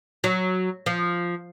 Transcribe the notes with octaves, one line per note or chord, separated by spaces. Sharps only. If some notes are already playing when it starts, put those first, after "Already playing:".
F#3
F3